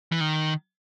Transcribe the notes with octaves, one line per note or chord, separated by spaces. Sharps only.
E3
D#3